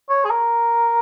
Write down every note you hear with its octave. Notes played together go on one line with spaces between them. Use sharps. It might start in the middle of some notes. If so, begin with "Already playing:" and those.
C#5
G#4
A#4